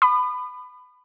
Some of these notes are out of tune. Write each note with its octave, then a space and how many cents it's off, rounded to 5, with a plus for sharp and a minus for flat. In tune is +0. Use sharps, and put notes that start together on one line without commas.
B5 +20 D#6 -40